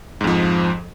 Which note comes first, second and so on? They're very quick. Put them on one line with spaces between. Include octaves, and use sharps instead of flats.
G#2 F2 F3